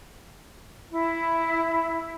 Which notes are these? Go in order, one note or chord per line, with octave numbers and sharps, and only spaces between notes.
E4